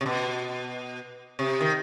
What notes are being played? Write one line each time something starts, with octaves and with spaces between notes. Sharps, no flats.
C3
B2
C3
D#3